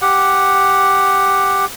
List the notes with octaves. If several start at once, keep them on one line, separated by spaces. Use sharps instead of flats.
G4 F#5